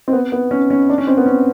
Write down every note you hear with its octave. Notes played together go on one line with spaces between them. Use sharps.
C4
B3
B3
C#4
C#4
D4
C#4
C4
B3
C#4